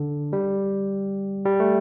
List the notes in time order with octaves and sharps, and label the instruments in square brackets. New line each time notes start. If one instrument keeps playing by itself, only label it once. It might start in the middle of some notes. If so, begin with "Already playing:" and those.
Already playing: [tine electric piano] D3
G3
G3
A3